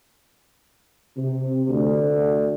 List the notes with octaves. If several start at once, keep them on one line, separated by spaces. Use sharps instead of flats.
C3
D2